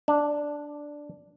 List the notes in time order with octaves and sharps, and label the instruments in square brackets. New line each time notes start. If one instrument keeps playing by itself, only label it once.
[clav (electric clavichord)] D4